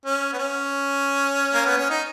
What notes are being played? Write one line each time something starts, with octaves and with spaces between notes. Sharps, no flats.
C#4
B3
C#4
A#3
B3
C#4
D#4